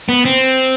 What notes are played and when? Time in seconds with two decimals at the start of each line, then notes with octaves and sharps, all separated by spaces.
0.09 B3
0.25 C4